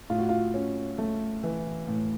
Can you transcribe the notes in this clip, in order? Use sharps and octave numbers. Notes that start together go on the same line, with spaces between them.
A2 F4
F#4
F4
C#4
A3
E3
A2